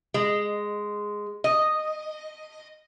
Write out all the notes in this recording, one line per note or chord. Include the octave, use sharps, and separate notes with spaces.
G#3
D#5